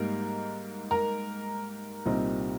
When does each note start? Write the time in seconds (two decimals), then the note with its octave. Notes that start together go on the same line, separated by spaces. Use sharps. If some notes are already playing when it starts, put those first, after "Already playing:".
Already playing: G#2 G3 A#3 D#4 A#4
0.91 A#4 A#5
2.06 C2 A#2 G3 C4 D#4